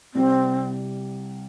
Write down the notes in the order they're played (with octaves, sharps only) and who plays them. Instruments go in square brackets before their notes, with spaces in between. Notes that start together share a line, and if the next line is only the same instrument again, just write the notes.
[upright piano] C2 C3 G3 [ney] C4